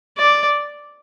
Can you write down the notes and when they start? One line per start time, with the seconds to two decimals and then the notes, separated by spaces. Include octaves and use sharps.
0.18 D5